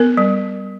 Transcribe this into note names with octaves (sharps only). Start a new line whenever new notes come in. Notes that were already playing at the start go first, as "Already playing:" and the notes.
Already playing: B3 A#4
G3